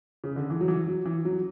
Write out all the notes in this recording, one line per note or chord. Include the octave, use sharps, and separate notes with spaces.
C#3
D3
E3
F#3
E3
F#3
E3
F#3